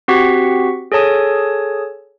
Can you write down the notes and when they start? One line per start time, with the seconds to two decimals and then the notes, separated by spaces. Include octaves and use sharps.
0.08 C4 F#4 G4 F#5 C#6 B6
0.92 G#4 A4 C#5 A5 D#6